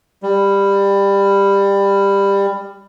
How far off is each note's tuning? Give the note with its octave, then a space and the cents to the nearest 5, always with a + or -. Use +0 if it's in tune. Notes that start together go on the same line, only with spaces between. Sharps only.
G3 +20